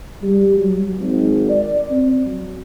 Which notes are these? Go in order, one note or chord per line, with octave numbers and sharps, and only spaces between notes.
G3
F#3
G#1
D5
C4
F#3